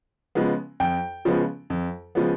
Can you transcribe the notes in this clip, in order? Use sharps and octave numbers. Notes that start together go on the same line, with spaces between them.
C#3 F3 G#3 B3
F2 G5
C#3 F3 G#3 B3
F2
C#3 F3 G#3 B3